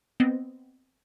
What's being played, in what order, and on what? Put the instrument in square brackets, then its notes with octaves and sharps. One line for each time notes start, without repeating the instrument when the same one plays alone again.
[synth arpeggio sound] B3 C4 D#5